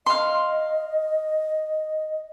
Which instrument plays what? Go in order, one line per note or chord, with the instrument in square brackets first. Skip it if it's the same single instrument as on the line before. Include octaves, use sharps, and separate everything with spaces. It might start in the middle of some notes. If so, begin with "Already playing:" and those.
[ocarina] D#5 [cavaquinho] F5 C6